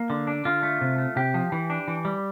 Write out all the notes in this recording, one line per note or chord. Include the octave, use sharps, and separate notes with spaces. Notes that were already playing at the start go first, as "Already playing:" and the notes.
Already playing: A#3
D3
D4
D3 F4
A3
C3
A3
C3 G4
F3
E3
D4
E3
G3